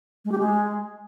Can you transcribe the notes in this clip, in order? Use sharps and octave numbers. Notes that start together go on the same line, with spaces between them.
G#3
G4
G#3